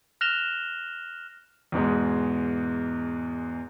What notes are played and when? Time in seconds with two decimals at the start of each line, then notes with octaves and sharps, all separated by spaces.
0.21 F6 F#6 A#6 E7 F7 G7
1.72 E2 G#2 B2 G#3